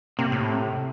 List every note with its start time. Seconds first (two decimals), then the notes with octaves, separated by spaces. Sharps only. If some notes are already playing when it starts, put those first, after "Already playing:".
0.19 C3 A#3
0.32 A2